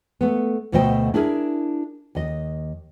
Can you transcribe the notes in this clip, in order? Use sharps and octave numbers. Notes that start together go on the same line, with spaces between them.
A3 B3
D2 B2 A3 C5 D#5 G5
D4 E4 G#4 A#4
D#2 D#5